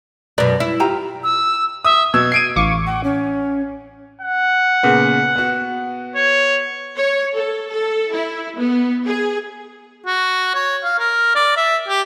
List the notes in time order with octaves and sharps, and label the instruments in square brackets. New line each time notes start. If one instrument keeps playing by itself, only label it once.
[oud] F#2 B2 [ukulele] D5
[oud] E4
[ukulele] F4 G4 A#5
[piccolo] E6
[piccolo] E5 [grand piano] D#6
[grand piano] B2 E6 [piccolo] G#6
[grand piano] C7 D7 D#7
[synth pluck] A1 C#6 D6 [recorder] F5
[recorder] F#5
C#4
[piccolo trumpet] F#5
[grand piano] A#2 C#3 B3
B3 F#4
[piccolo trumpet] C#5
[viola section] C#5
A4
A4
E4
B3
G#4
[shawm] F#4
C#5
F5
A#4
D5
E5
G4